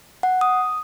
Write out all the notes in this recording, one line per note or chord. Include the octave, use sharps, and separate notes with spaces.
F#5
D#6